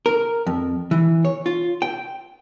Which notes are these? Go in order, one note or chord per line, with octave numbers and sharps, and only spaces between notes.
A#4
F2
E3
C#5
F4
G5